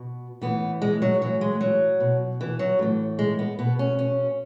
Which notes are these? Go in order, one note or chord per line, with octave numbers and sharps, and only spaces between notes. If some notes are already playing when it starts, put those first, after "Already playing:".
Already playing: B2
A2 E3 B3
G#3
F#3
A2 E3 F#3
G#3
F#3
B2
E3
F#3
A2 E3
G#3
B3
B2 B3
C#4
C#4